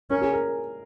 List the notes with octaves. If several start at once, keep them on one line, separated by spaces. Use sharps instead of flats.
C#4 A#4
G#4
A#4